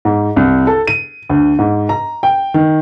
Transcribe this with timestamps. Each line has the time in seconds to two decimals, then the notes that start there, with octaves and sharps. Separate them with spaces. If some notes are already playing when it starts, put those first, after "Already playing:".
0.05 G#2
0.36 C2
0.67 A4
0.87 D#7
1.29 D2
1.59 G#2
1.89 A#5
2.23 G5
2.54 D#3